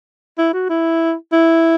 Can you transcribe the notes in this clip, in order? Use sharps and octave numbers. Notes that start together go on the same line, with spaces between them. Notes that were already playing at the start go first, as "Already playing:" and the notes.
E4
F#4
E4
E4